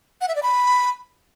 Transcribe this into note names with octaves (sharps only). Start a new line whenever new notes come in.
F#5
E5
D5
B5